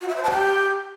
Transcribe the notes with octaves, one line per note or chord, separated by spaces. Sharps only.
F#4
E5
C5
A5
G4